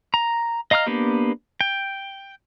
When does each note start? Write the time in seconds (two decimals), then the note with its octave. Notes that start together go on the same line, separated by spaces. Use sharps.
0.14 A#5
0.71 D#5 F5 A#5 D#6 F6
0.87 A#3 B3 D4 G4
1.61 G5